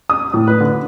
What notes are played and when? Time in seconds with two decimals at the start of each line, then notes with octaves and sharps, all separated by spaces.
0.10 D#6
0.34 A2
0.47 B4
0.60 D3